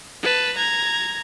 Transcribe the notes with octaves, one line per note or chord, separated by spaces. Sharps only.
B4 A5
A#5 G#6